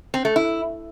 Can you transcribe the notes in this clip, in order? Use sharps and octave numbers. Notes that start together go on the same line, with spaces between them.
C4
A3
E4